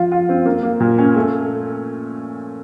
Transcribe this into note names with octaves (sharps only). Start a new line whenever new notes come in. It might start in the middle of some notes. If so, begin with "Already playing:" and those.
Already playing: F3 F4
F4
C4
A#3
A#3
A#2
C#4
A3